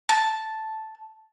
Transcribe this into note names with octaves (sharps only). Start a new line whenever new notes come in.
A5